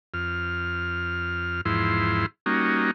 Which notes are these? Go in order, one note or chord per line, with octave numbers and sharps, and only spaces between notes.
F2 F6
E2 G#2 F3 E4 C6
G3 A#3 C#4 D#4 F#4